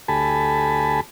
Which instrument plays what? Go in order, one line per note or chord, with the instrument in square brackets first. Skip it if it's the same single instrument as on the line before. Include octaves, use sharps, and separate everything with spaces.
[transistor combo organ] D2 G4 A4 G#5 A5 B5